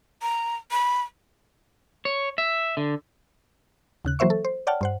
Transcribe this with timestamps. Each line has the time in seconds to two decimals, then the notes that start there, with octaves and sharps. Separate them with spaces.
0.22 A#5
0.71 B5
2.05 C#5
2.38 E5
2.77 D3
4.05 D#2 C#3 F#6
4.19 E3 F#3 A#3 C5 E5 C#6
4.30 A4
4.45 C5
4.67 C#5 D5 F#5 G5 A5 F6
4.81 G2 C5 F#5